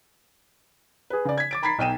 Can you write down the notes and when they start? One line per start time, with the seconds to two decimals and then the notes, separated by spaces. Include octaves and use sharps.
1.10 G#4 B4
1.25 C#3 D5
1.38 G#6 B6
1.51 D6 A6 D7
1.63 A#5 B5 G#6 A6 B6 C7
1.78 B1 D#4 G5 D#7 E7